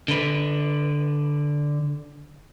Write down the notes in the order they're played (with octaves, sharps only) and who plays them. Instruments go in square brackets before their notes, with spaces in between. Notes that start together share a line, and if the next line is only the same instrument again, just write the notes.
[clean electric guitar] D3 B4